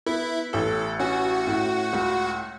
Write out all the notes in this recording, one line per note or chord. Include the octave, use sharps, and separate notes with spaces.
B3 E4 E5
A1 A4
C#4 F#4 F#5
A2
C#2